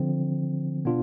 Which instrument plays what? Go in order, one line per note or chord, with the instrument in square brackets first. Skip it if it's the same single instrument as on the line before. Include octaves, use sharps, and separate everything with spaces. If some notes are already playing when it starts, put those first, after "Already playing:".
Already playing: [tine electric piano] D3 F3 C4
B2 B3 D4 F4